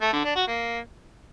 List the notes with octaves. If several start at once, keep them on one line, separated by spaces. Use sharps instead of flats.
A3
D3
D4
F#4
A#3